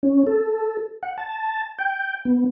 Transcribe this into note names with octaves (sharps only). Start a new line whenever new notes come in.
C#4
A4
F#5
A5
G5
B3